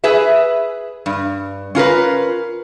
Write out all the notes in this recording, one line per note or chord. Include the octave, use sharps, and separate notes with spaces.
G#4 B4 E5
G2
C#4 F4 A#4 B4